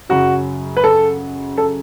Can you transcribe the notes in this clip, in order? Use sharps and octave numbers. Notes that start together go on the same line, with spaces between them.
F#2 C#3 F#3 F#4
B4
A4
A4